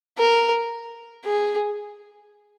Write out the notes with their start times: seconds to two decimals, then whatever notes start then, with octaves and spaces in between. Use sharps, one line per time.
0.18 A#4
1.25 G#4